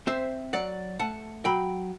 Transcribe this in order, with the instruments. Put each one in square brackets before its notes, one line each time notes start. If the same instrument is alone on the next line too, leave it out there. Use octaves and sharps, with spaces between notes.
[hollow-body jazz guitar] C4 C5 E5
F#3 D5 F#5
A3 F#5 A5
F#3 G5 B5